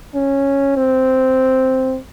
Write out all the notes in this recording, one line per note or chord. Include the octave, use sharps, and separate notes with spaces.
C#4
C4